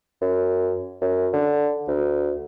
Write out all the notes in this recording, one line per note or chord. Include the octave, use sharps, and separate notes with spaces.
F#2
F#2
D3
D2